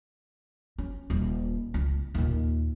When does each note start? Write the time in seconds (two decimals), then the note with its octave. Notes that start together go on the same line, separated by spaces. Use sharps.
0.78 C#4
1.10 D#1
1.74 C#2
2.14 D#2 A#2